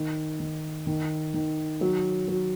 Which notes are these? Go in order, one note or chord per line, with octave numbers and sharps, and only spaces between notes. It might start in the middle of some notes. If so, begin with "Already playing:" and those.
Already playing: D#3
D#3
D#3
D#3
F#3
F#3